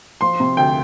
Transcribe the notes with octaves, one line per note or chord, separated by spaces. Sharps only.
F3 C6
C3
D2 G5